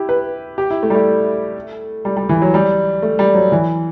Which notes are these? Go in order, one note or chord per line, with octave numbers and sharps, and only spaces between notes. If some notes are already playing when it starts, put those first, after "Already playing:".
Already playing: E4 G4
B4
G4
E4
A3
G3
A3
G3
G3
E3
F#3
G3
A3
G3
F#3
E3